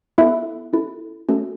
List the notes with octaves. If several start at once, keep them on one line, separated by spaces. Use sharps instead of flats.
B3 E4 A4 E5
C#4 E4 A4
A3 C#4 F#4 A4